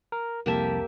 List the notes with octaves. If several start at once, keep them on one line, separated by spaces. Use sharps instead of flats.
A#4
C2 F2 A#3 G4 E5 A5